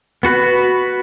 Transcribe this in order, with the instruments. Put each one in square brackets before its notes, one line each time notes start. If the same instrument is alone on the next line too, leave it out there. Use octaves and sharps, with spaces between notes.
[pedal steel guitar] B3 F#4 B4